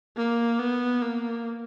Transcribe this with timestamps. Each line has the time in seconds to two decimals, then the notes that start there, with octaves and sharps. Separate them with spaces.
0.17 A#3
0.60 B3
1.02 A#3